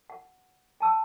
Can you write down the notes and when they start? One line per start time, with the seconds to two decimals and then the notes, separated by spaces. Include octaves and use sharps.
0.10 F#5
0.80 G5 A5 E6